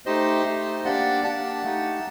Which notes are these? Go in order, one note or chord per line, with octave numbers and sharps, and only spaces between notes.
A3 D#4 G4 C5 D#5
A3 D#4 G4
A#3 D4 G4 D5 F#5
A#3 D4 G4 F#5 A5
A3 D#4 G4